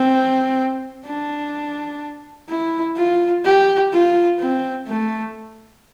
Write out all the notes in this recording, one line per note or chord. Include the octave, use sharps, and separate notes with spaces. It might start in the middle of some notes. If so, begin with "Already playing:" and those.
Already playing: C4
D4
E4
F4
G4
F4
C4
A3